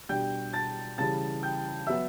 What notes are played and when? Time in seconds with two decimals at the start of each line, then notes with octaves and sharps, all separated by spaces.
0.09 B2 G3 D4 G5 G6
0.53 A5 A6
0.98 C#3 E3 G3 A5 A6
1.43 G5 G6
1.87 F#3 B3 E5 E6